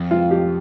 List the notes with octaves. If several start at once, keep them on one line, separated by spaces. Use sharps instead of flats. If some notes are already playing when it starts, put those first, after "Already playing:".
Already playing: F2
F4
G4